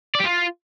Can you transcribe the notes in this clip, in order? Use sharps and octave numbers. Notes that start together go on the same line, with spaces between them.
D5
G4
F4